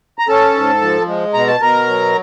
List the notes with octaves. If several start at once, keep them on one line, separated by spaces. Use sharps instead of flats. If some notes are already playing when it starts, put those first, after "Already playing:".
A#5
C#4 A4 A5
G#2
F3
G#3
B2 A#5
A5
B2 A#4 A#5
F#3